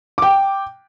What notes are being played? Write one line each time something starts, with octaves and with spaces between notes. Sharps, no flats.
G5 D6